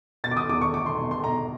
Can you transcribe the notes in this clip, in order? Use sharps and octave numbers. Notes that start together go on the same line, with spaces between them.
B2 A6
D6
D#6
E2 D6
C#6
A3 D6
C6
B2
C6
B2 A#5